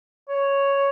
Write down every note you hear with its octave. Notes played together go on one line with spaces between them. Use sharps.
C#5